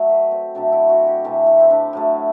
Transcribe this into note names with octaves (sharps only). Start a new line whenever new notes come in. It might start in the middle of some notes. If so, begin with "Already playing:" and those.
Already playing: F#3 A3
B4
C4
C3 F#3 A3 D4
E4
F#4
G4
C3 E3 A3
E4
C4
D4
A2 F#3 A3